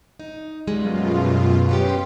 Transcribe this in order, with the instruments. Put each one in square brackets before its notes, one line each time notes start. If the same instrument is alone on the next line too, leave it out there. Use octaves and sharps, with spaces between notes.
[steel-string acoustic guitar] D#4
[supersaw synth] F#2 B2 F4 [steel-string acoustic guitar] G3 G#3
[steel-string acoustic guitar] B3 C#4 G4 [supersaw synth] G5 C6